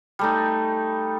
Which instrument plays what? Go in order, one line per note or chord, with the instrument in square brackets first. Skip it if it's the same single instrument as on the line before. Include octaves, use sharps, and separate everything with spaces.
[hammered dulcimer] G3 A3 D#4